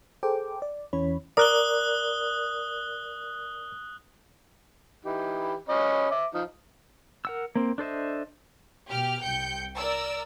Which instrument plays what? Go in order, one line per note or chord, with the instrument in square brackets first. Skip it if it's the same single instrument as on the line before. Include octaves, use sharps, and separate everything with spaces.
[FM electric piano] G#4 A4 C5 G5 D6
D5
E2 E3 C#4 C#5 B5
[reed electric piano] A#4 D5 [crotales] D#6 F#6 G7
[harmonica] E3 D#4 G4
C#4 D#5 B5
E5 D6
F3 D#4
[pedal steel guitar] A#4 F#5 E6
A#3 C4
D4 A4 C5 D#5 E5
[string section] B2 G4 F6
C2 G5 G6 C#7
A#4 D5 E6